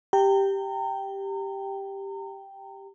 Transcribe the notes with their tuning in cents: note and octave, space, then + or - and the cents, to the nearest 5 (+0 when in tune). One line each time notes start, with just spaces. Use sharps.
G4 +0 G5 -5 A#5 -35